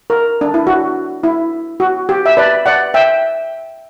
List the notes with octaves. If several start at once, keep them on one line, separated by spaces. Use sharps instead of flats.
A#4
D4
E4
F#4
E4
F#4
G4
E5
B4 D5
D5 F#5
E5 G5